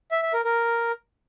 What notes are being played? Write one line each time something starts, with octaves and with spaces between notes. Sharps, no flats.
E5
E5
A#4
A#4